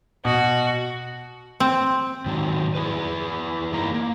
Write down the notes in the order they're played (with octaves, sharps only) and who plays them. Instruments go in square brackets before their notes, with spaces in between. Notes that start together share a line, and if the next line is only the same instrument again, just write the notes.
[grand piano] B2 [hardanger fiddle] F#4
[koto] C4
[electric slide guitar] G#2 D#3 F#3
E4 G#4 B4
G2 E3 A#3 D#4 A#5
A#3